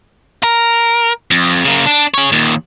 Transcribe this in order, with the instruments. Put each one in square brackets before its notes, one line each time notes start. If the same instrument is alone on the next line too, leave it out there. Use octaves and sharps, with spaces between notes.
[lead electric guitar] A#4
F2
C#3 A#3
D4
G#4 C#5
D#2 A#2